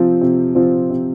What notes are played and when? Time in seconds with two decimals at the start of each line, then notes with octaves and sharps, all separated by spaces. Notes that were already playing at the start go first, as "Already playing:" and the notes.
Already playing: C3 F3 C4 F4
0.21 C3
0.55 F3 C4 F4
0.90 C3